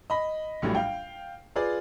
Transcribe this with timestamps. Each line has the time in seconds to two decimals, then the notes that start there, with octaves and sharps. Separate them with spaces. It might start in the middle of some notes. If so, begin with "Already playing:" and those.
0.10 D#5 B5
0.62 A#1 A2 F#3 G3
0.75 F5 G5
1.56 F4 G#4 B4 D5